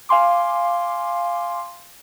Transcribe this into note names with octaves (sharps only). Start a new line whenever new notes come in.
F5 G#5 C6 D6